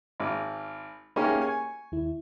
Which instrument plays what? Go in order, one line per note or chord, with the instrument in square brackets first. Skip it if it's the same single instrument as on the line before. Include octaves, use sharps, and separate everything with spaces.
[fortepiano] G#1 [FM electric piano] B5 D6 F6
[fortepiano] A#3 C#4 G4 [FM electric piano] D#4 G#4 E5
[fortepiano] G#5 [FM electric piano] C#6
[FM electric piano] D#2 E4